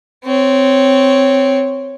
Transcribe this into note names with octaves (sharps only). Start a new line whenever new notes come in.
C4 C#5